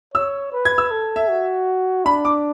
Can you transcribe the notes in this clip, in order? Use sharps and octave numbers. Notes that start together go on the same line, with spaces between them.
C#5 E6
B4
G#6
E6
A4
E5
F#4
D4 B5
D6